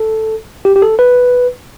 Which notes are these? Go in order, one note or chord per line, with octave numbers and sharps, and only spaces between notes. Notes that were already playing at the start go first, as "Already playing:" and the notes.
Already playing: A4
G4
G4
A4
B4